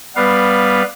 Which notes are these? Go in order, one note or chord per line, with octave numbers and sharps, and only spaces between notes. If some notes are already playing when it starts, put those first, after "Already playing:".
G3 B3 B4 F5